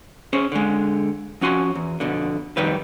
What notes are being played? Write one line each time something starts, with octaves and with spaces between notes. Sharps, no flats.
C#4 G#4 C5
D3 G#3
F3 C#4 F#4 G#5 C6
E2
F2 B2 D3
B1 F2 D#3 G3 B4